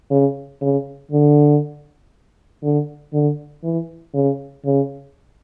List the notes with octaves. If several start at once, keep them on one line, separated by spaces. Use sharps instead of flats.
C#3
C#3
D3
D3
D3
E3
C#3
C#3